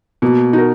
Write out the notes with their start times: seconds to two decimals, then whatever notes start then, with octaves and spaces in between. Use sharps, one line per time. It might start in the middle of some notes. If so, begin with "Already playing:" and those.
0.22 B2 A#3
0.53 D#4 F#4 A#4